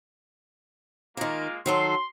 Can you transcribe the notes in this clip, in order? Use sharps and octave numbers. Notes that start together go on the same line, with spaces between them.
D#3 G#3 A#3 F4 A#4
D#3 F#3 A4 C6